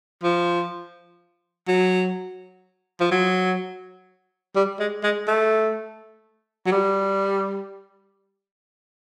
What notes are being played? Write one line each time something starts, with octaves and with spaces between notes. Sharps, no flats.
F3
F#3
F3
F#3
G3
G#3
G#3
A3
F#3
G3